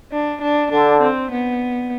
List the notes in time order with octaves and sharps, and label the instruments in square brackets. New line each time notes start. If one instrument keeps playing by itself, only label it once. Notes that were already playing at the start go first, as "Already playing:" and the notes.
[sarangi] D4
D4
[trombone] D3 [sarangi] D4
[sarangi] C4
B3